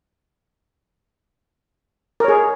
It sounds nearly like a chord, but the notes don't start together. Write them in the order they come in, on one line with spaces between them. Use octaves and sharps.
A#4 C#5 G#4